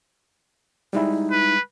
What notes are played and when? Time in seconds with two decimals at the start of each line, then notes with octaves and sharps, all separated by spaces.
0.93 G3 G#3 D#4 E4
1.31 B4